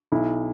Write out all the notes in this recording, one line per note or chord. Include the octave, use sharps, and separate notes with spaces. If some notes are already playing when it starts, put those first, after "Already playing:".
B1 E4